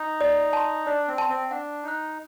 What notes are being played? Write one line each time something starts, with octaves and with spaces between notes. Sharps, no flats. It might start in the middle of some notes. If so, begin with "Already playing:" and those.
Already playing: D#4
D5
A5 C6
D4 D5
C4
A5 C6
C4
D4 F#5
D#4 A#5 F#6